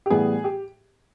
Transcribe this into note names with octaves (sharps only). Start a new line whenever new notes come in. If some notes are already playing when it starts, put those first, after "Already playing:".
G4
A2 E3 G3 B3 G#4
G4